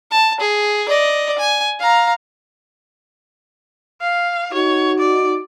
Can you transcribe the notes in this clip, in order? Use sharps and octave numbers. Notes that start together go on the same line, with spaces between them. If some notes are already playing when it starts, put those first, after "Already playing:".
A5
G#4
D5 D#5
G#5
F5 A#5
F5
D#4 F#4 C#5
D5